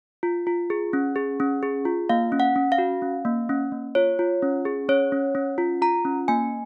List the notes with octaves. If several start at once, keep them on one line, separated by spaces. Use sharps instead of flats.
F4
F4
G#4
C#4
G#4
C#4
G#4
F4
A#3 F5
C#4
F#5
C#4
F5
F#4
C#4
A#3
C#4
A#3
F4 C#5
F4
C#4
G#4
C#4 C#5
C#4
C#4
F4
F4 A#5
C#4
A#3 G#5